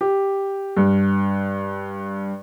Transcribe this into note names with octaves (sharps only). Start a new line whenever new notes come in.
G4
G2